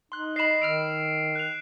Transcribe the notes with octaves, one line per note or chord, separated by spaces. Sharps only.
D#4 C6 F#6
D#5 B5 C7 E7
D#3 E6 F6 D7 F7
F#6 F7